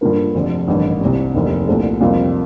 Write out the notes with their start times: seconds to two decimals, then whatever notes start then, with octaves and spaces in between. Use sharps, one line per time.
0.01 G2 D3 F3 A#3
0.34 F1 F2 D3
0.68 A1 G2 D#3
1.01 C2 C3 G3
1.34 F1 D#2 D#3
1.68 C2 A#2 A3 D4
2.01 F2 C3 G3 A#3 F4